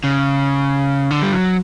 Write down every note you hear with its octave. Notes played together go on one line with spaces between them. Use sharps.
C#3
D3
G3
F#3